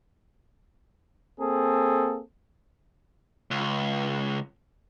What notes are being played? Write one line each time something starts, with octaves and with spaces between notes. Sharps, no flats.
A#3 C4 G#4 A4
C#2